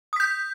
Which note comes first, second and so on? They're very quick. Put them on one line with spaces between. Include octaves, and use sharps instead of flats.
D#6 B6 G6